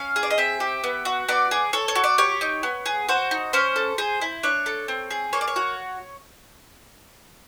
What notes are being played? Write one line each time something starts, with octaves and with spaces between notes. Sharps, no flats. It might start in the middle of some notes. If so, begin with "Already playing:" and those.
Already playing: C#4 F5
G#4
D5
D#5
C4 E5
G4
B3
F#4
B3 D5
G#4
A4 C#5
C#5
F#4
D5
G4 C#5
D#4
B3
G#4
F#4 C5
D#4
C#4 C5
A4
G#4 C5
E4
D4 C#5
A4
C4
G#4
A#3 C#5
D5
C#5
F#4